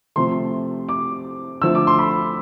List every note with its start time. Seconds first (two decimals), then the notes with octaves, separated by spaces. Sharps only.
0.16 C3 F3 A3 C6
0.89 D6
1.62 D3 F3 A3 E6
1.75 D6
1.87 C6
1.99 B5